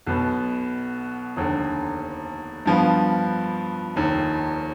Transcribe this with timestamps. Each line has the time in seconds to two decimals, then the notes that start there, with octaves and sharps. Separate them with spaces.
0.07 B1 B2 B3
1.36 F1 D#2 D3
2.66 G2 F3 B3 F4
3.96 F1 D#2 D#3